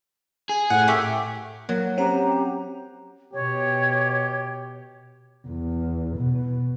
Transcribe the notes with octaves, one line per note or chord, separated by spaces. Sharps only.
G#4
A2 F#5
A3 G4 A#4
F#3 A#3
C4 C#4 G4 F#5 A#5
B2 G4 C#5
E2
B2